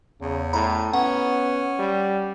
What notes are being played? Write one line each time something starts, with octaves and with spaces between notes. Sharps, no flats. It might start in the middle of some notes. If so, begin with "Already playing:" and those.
E2 C#3
A2 A#5 B5
B3 C#4 F#5
G3